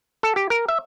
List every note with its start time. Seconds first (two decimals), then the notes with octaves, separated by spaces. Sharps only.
0.23 A4
0.36 G4
0.50 A#4
0.68 E5